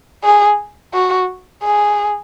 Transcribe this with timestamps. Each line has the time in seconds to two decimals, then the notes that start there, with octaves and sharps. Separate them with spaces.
0.24 G#4
0.94 F#4
1.63 G#4